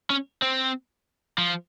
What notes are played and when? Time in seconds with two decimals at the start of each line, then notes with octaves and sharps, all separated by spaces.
0.10 C#4
0.42 C4
1.38 F3